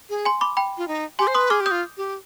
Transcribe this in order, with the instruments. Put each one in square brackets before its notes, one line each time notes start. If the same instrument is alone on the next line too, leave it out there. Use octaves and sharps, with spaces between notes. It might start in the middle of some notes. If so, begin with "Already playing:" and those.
[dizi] G#4
[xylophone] G#5 C6
B5 D6
G5 B5
[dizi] F4
D#4
[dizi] G4 [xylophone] G#5 C6
[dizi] C5
[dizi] B4 [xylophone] C6 D#6
[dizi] G#4 [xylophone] D6 F6
[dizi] G4
[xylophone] D#6 G6
[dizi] F4
G4